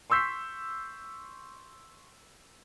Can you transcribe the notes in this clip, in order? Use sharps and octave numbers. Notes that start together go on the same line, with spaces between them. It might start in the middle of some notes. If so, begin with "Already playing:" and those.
C6 C#6 E6 G6 B6 C7